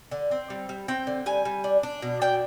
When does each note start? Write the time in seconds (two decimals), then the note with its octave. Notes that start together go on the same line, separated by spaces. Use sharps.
0.11 D3
0.31 C4
0.50 G3
0.69 G3
0.88 C4 G5
1.07 D3
1.26 G3 G#5
1.45 G3
1.64 D4
1.83 D4
2.02 B2
2.21 D4 G5